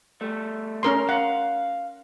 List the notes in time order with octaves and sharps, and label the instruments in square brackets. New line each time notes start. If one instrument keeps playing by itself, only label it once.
[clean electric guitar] G3 A3
[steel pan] C#4 A#4 C6
[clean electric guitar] F5 [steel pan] F#5